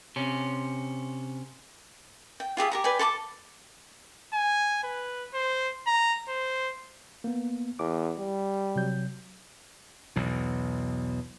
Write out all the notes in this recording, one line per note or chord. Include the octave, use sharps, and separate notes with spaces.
C3 C#4
G5
F4 G4 G#4 E5
G4 A#4 A#5
B4 D5 G5 G#5
A4 A5 C6 D6
G#5
B4
C5
A#5
C5
A#3 B3
E2 D6
G3
C3 F#3 G6
B1 E2 B2